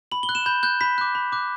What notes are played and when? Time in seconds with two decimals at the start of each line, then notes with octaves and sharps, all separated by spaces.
0.12 B5 F#7
0.23 G7
0.29 F#6
0.35 E7
0.46 B5 G6
0.63 F#6 G6
0.81 B5 B6
0.98 D6 F#6
1.15 B5
1.32 D6 F#6